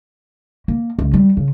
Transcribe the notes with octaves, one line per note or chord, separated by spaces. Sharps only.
A#3
C#2
G3
C#3